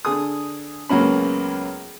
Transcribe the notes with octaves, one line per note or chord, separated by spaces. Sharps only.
D3 G#4 D#6
C#2 F#3 A#3 B3 C#4 B5